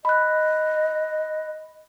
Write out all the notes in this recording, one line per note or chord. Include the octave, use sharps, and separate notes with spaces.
D#5 B5 F#6